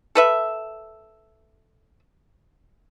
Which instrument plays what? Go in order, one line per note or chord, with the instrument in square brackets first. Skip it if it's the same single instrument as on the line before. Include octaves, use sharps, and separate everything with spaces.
[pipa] A4 B4 E5